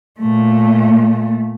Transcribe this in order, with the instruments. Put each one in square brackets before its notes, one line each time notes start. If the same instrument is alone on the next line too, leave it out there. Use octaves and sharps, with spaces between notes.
[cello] A#2 A3